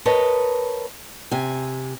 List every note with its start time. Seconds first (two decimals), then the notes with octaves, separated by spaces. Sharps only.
0.05 A#4 B4 C#5 D#5 A5
1.31 C3 G#5